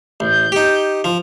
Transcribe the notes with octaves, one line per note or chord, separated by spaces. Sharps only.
A1 G6
D#4 G4
F3